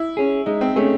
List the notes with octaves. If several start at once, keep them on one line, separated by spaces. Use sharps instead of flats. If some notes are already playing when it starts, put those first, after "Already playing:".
Already playing: E4
C#4 G#4
G#3 D#4
C4
A3 C#4 G#4